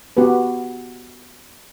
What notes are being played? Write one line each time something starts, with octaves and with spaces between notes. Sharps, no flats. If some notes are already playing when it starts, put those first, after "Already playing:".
B3 F#4 G4 B4